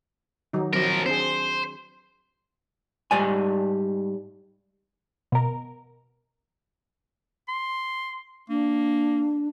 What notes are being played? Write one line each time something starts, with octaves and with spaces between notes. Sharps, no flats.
D#3 F#3 D#4
F3 F#3 C4 A#4
C4 D4 G#4 C5
G#2 G3 D5 G#5
B2 A#4
C6
A#3 D4